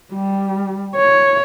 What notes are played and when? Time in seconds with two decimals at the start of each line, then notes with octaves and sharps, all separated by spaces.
0.13 G3
0.95 C#5